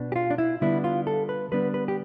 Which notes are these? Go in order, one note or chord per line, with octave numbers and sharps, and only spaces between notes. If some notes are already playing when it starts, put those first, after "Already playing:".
Already playing: B2 B3 D4
G4
F4
D4
E4
D3 G3 B3 D4 E4
F4
A4
B4
D3 G3 B3 D4 B4
B4
G4